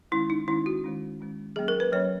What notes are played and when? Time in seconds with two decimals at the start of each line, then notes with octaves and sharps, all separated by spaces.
0.12 D#3 G#3 C#4 E4
0.30 D#4
0.48 D#3 G#3 C#4 E4
0.66 F#4
0.84 D#3 G#3 C#4
1.20 D#3 G#3 C#4
1.56 F#3 A#3 C#4 G#4
1.68 A#4
1.80 B4
1.92 F#3 A#3 C#4 C#5